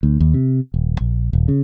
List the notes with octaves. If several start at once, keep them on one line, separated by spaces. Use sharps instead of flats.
D2
D#2
C3
D#1
A#1
D#1
C#3